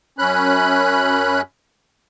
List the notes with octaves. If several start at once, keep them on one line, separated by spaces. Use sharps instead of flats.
F#2 C#4 B5 F#6